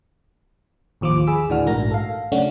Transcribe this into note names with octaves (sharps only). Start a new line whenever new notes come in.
A1 D#2 F3 F4 D6
G#4 B5 E6
D2 A2 E3 D4 F#4 F6
A#1 G#2 A3 F#4 A#4 A#6
A4 F5
C#3 F#3 A3 C#4 D4 F#4